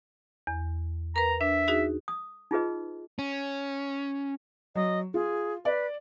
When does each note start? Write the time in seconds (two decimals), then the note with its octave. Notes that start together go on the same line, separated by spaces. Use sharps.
0.47 E2
1.16 A#4 B4 A#5
1.41 D4 E5
1.68 D#4 F#4 G#4
2.08 D#6
2.51 D#4 F4 G#4 B4 D#5
3.19 C#4
4.76 F#3 D#5
5.14 F4 G#4
5.65 B4 D5